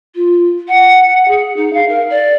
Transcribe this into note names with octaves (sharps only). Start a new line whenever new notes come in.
F4
F#5
G#4
D#4
F5
A#4
D5